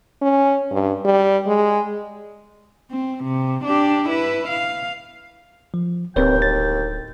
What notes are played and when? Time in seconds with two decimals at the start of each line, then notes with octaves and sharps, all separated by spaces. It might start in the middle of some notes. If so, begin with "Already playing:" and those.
0.22 C#4
0.71 G2
1.05 G3
1.46 G#3
2.91 C4
3.24 C3
3.64 D4 G4
4.08 E4 B4
4.48 F5
5.74 F3
6.16 D1 D#2 C4 B4 C#5 G5
6.42 A6